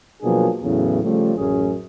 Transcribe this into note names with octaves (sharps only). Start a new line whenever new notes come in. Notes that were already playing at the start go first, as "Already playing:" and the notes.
B2 F3 F#3 A#3 D4 G#4
E2 A2 C#3 F#3 A3 B3
C#3 F3 G3 A3
A1 F#2 C#4 G#4